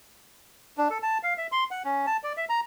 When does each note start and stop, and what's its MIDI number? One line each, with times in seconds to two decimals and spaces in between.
0.78 0.88 62
0.90 0.98 69
1.03 1.18 81
1.23 1.34 77
1.38 1.47 76
1.52 1.64 84
1.71 1.83 78
1.85 2.06 61
2.07 2.17 81
2.24 2.33 74
2.37 2.45 76
2.49 2.60 82